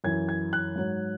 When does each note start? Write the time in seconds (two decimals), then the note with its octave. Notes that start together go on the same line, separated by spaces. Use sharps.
0.04 F#2 E3 G#6
0.29 G#6
0.53 F#6
0.76 G#2 F#3